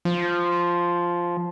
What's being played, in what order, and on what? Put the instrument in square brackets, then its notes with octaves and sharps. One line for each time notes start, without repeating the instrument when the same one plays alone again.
[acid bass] F3